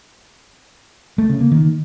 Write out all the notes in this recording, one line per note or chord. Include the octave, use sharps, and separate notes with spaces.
A3
C#3
A#3
D#3